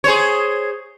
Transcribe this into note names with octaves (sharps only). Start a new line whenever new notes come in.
G#4 C5 C#5